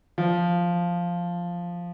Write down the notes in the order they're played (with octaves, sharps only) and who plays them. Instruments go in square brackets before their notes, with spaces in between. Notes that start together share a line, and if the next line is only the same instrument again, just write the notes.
[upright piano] F3